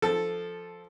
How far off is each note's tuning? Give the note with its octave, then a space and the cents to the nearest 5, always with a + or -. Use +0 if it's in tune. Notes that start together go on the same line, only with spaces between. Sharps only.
F3 +0 A4 +0